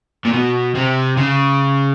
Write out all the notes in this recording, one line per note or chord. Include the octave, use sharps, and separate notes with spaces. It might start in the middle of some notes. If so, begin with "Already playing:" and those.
A#2
B2
C3
C#3